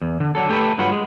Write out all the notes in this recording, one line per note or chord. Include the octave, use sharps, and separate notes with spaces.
E2
D3
D3 F#3 A4
A3 G4 A4 B4
G2 F#3 F4 B4 F#5
G#3